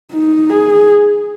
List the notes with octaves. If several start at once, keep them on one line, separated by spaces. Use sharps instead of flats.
D#4
G#4